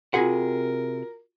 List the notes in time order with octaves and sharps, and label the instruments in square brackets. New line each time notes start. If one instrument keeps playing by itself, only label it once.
[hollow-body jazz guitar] C3 G#4 F#5 [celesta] F4 F#4 [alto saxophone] A#4